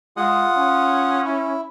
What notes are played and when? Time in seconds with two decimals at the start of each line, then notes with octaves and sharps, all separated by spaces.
0.17 G#3 F4 F#5 D#6
0.56 C#4
1.25 E4